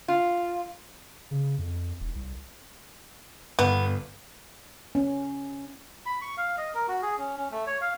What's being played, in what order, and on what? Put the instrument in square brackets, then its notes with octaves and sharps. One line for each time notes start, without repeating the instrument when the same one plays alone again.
[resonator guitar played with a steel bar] F4
[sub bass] C#3
F2
E1
C2
[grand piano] G1 [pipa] B3
[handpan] C#4
[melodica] B5
C#6
F5
D#5
A#4
F#4
G#4
C#4
C#4
A3
C#5
F5